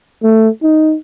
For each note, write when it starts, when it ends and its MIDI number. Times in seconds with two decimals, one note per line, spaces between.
0.23 0.48 57
0.63 0.95 63